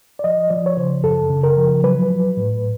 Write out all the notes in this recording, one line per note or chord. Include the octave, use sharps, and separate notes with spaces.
D5
F3 D#5
F3 D5
C#5
C#3 C5
F#2 A4
C#3
A#4
F3
F#3 B4
F#3
A2